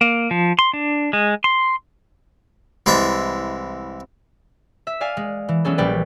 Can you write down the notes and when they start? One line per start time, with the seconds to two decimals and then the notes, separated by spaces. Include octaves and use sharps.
0.01 A#3
0.31 F3
0.59 C6
0.73 D4
1.13 G#3
1.44 C6
2.86 C2 E3 G#3 E5 A5
4.87 E5
5.01 D5 F5 G#5
5.17 G#3
5.48 E3
5.65 E3 F#3 B3 C#4 G#4 A4
5.78 A#1 F3 G3 B4 D5 G5